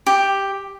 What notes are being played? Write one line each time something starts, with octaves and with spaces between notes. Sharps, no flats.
G4